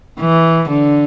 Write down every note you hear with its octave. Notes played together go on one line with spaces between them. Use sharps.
E3
D3